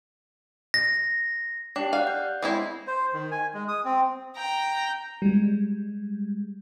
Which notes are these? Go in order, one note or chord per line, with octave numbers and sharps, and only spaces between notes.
A#6
D4 G4 G5
D5 F5 F#5 F#6
G6
G#3 C4 E4
C5
D#3
G#5
G#3
D#6
C4
G5 A#5
G3 G#3